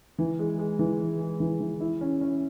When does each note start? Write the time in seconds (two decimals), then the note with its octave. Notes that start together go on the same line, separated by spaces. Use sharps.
0.18 E3
0.39 G#3
0.59 G#3
0.79 E3
0.99 G#3
1.20 G#3
1.40 E3
1.60 E3
1.80 E4
2.01 C#4
2.21 C#4